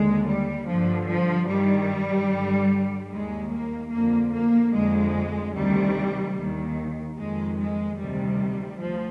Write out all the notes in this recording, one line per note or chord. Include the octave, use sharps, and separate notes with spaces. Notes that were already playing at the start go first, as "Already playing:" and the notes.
Already playing: D#2 D3 G#3
G3
G2 D3 F3
F3
G2 D#3 G3
G2 D3
D#2 D#3 G#3
A#3
F2 D3 A#3
A#3
F2 D3 G#3
D2 C3 D#3 G3
D#2 D#3
F2 D#3 G#3
G#3
D2 C3 D#3 G3
D2 F3